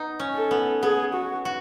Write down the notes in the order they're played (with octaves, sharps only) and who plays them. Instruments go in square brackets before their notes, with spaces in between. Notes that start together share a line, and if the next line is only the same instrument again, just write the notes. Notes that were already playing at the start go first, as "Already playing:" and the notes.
Already playing: [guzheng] B3 D#4
C#4
[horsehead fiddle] A4
[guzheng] B3
[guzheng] B3 [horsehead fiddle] G#4
[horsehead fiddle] F#4
[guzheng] F#4